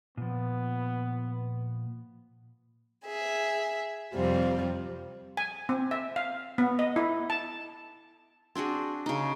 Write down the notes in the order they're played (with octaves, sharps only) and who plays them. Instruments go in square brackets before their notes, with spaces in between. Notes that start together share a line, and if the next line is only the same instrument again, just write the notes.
[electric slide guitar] A#2 F3 [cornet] B3
[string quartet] G#4 E5
F2 C3 G3 C4 F4
[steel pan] G#5
C4
E5
F5
B3
D#5
E4
A5
[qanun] C4 D4 F#4 G#4
C#3 D#4